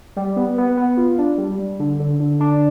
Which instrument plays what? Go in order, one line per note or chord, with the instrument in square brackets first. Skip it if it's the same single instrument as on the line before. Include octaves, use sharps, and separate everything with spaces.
[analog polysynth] G3
B3
B3
B3
F4
D4
G3
G3
D3
D3
D3
D4